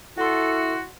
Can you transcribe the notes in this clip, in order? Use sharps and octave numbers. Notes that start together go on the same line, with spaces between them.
E4 F#4 A4 F#5 C6